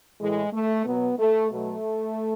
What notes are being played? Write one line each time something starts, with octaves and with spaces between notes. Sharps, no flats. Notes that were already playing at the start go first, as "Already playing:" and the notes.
A2 E3 G#3
A3
B2 F#3 B3
A3
B2 F#3 A3